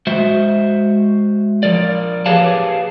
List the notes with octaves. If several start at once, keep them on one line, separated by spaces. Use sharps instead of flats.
G#3 F#4 C5 E5
F3 A#4 D5
G4 G#4 B4 C#5 F5 A5